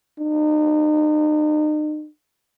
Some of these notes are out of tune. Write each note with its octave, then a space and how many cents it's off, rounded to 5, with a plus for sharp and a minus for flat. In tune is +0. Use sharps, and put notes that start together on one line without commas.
D#4 -40